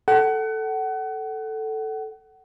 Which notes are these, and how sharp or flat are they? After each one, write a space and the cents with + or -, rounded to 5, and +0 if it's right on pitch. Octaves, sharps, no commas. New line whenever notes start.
A4 +0 F#5 +30